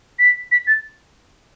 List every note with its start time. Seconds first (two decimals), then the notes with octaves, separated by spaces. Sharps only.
0.19 B6
0.52 B6
0.67 A6